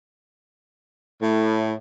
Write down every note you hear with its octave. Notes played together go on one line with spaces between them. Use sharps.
A2